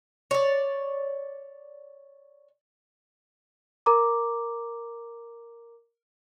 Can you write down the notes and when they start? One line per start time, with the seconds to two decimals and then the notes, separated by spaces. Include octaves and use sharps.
0.31 C#5 D5
3.86 A#4 A#5 D6